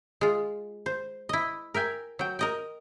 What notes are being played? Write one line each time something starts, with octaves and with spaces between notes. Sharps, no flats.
G#3 F4
C5
E4 D#5
A#4 E5 G5 G#5
F#3 G5
A#4 D#5 G5